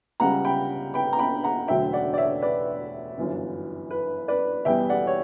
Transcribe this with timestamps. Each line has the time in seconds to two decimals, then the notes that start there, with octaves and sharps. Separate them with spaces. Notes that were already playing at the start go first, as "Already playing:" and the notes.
0.20 C#2 C#3 G3 F#5 A#5
0.45 G5 B5
0.94 G5 B5
1.13 A#5
1.19 G5 B5
1.44 F#5 A#5
1.68 E1 D2 D3 F#3 E5 G5
1.93 D5 F#5
2.14 D5
2.18 C#5 E5
2.42 B4 D5
3.18 G1 F#2 E3
3.91 B4
4.28 B4 D5
4.65 E2 B2 G3 E5 G5
4.89 D5 F#5
5.07 C#5